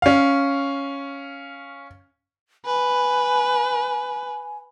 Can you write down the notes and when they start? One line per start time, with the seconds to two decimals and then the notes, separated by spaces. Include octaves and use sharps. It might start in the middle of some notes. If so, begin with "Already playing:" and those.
0.02 C#4 F5
2.66 B4 G#5